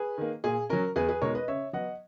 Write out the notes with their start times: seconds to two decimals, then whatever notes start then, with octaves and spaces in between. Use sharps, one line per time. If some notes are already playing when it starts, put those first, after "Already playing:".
Already playing: G#4 B4
0.18 D#3 A#3
0.44 A#2 G#4
0.70 F#3 C#4 A#4
0.96 E2 G#4 B4
1.09 G#4 B4
1.22 B2 G#3 D#4 A#4 C#5
1.35 B4 D#5
1.48 C#3 C#5 E5
1.73 F#3 B3 D#5 F#5